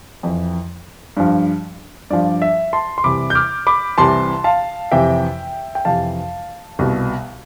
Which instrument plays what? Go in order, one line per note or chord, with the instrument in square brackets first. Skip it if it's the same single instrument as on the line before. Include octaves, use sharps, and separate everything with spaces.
[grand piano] F2 E3
G2 F3
G2 F3 D5
E5
A5 C6
C6
C2 C3 E3 B5 D6
G6
D6 F6
B5 D6
C2 C3 E3 A5 C6
F5 A5
F2 C3 E3 E5 G5
G5
F2 C3 E3 F5 A5
C2 B2